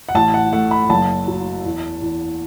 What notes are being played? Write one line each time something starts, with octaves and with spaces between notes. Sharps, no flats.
F#5
A1 A5
F#5
A3 F#5
B5
F#1 A5
F#3
E2
E2